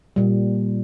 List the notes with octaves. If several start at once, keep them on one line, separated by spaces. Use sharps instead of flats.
A#2 G3